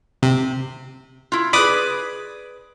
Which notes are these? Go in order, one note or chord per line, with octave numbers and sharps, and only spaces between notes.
C3
E4 F4
G#4 B4 D5 B5 D6 D#6